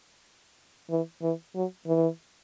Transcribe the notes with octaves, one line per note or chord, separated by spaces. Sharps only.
E3
E3
F#3
E3